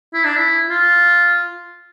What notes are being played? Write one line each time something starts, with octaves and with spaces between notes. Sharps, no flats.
E4
D4
E4
F4